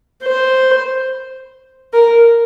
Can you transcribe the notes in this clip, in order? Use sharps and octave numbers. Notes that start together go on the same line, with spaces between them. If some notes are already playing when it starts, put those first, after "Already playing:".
C5
A#4